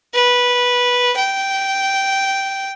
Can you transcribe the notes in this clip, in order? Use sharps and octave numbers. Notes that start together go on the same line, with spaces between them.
B4
G5